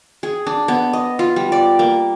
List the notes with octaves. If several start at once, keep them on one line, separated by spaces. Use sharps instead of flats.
G#4
D4
B3
D#5
F4
G3
D5
A#3